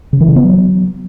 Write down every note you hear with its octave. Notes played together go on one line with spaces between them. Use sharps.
C#3
E3
C#3
B3
F#3